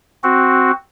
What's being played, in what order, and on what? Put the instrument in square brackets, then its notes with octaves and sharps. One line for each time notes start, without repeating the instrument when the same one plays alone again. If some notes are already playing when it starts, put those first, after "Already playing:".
[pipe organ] C4 F#4